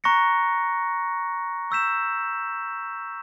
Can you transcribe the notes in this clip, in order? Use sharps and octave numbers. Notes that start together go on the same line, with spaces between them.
A#5 C#6 F#6 A#6 C#7
C#6 E6 G6 B6 E7